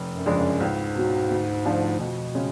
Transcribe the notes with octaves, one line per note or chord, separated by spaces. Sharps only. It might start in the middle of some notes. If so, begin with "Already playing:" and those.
Already playing: F1
F#2
F2 C#3 G#3 D4
F#2
C#2 G#2
B2 F#3
D2
D3 F3 A3 D4
F2 B2
C#3 G#3 C#4